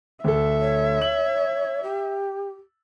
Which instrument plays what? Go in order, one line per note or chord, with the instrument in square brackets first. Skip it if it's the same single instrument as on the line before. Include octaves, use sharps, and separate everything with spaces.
[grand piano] D2 A4 [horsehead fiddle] E5
[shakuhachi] C#5
[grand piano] F#7
[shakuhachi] G4